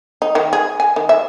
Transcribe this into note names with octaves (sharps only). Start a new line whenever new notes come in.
D#4
D#3
G#4
G#5
D#3
E5